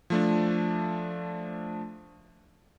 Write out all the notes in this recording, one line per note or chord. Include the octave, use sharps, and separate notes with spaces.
F3 A3 D4